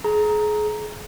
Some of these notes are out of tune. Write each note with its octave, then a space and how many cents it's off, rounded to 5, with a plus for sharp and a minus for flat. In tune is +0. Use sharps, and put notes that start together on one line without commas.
G#4 +30 A#5 +0